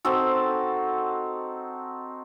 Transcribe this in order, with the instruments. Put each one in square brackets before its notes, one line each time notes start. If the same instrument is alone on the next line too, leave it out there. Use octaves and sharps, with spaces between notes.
[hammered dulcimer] C4 D#4 F#4 A4